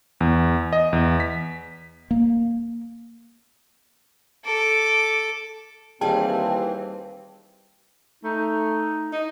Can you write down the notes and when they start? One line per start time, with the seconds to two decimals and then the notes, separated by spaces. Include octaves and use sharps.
0.21 E2
0.73 D#5
0.93 E2
1.20 B6
2.11 A#3
4.45 A4 D6
6.01 D#2 E3 G3 C4 G#4 F5 G5 A5
8.24 A3 D#4
9.13 D#4